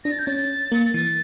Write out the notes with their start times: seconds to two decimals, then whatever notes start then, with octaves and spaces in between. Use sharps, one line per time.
0.05 D4 A#6
0.12 A6
0.19 G6
0.26 C#4 A6
0.72 A#3
0.94 E3 A6